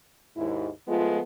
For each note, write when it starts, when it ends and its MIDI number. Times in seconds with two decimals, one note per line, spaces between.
0.36 0.69 39
0.36 0.69 44
0.36 0.69 64
0.88 1.20 53
0.88 1.20 56
0.88 1.20 57
0.88 1.20 59
0.88 1.20 65